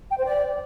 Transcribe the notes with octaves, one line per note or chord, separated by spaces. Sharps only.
G5
C5
D5